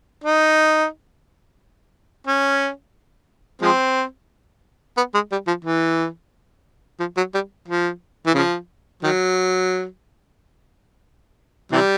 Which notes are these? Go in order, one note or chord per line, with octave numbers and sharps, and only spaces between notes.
D#4
C#4
F3 G#3 C4
B3
G#3
G3
F3
E3
F3
F#3
G3
F3
E3
C#3 F3
D#3 F#3
C3 E3 G3